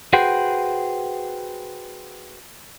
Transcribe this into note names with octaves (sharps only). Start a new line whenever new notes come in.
F#4 G#4 B4 C5 F#5 G5